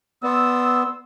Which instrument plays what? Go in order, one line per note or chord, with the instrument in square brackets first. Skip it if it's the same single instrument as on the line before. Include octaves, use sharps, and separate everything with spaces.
[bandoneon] B3 [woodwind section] D5 C6 E6